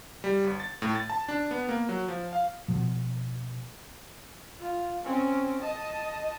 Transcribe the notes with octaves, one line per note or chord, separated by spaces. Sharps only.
G3
G1
A6
A2
A6
A5
D4
B3
A#3
F#3
F3
F5
B2 F3
F4
C4 C#4
D#5 A5